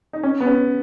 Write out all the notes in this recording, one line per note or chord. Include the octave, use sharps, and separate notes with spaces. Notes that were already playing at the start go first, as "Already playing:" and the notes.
D#4
C#4
B3
C#4